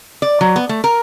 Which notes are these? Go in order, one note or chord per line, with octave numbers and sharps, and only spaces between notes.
D5
F#3
B3
A3
A#4